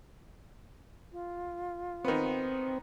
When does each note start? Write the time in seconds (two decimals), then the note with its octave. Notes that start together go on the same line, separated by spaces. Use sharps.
1.12 F4
2.05 D#3 B3 C4